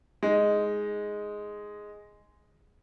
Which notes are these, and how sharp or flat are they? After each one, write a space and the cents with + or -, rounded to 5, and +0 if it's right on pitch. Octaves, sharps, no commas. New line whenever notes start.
G#3 +0 D#4 +0